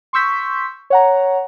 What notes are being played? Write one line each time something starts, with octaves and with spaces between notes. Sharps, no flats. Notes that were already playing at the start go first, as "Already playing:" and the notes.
C6 C#6 E6 G6 B6
C#5 F#5 A#5